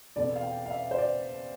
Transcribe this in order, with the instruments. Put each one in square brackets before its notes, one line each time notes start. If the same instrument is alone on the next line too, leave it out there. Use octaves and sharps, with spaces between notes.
[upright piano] E2 B2 A3 C4 D5
F5
G5
F5
E5
C5
D5